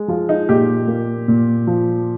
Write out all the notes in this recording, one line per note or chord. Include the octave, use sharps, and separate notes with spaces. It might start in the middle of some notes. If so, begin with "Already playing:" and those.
Already playing: G#3
F3 F4
D#4
A#2 G4
A#3
A#2
F3